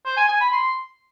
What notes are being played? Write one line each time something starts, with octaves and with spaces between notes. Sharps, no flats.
C5
G#5
G#5
B5
C6